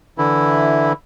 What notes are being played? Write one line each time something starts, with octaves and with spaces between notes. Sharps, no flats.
D3 E3 E4